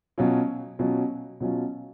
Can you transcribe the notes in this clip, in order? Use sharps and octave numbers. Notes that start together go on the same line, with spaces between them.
B2 F#3 C#4 F4
B2 F#3 C#4 F4
B2 F#3 C#4 F4